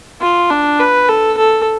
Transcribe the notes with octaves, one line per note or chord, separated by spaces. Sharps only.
F4
D4
B4
A4
A4